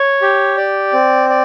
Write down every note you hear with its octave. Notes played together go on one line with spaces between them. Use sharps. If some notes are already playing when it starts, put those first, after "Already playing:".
Already playing: C#5
G4
D5
C4
D5